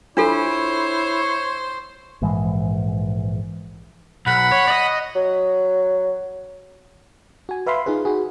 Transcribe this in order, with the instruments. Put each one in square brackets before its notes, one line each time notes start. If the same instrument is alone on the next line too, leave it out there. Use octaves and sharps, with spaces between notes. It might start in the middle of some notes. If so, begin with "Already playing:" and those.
[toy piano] D4 F4 A4 [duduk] E4 [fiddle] C5 [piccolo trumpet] C#5
[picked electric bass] A#1 G#2 E3 G#3
[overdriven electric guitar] B1 [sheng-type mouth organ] F#5 B5
[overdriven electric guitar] C#5
D5 D#5
[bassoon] F#3
[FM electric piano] F#4 G#5
B4 E5 F5 B5 C6
D#4 F4 G#4 B4
F#4 G#4